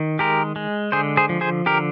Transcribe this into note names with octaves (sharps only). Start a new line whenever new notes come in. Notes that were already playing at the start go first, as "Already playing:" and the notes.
Already playing: D#3
G#3 G4 A#4
G#3
D3 G#4 C5
G#4 C5
F3
G#4 C5
D3 G4 A#4